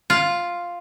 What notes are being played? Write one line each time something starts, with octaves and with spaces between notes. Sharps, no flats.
F4